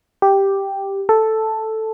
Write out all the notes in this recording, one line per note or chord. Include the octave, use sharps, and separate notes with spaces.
G4
A4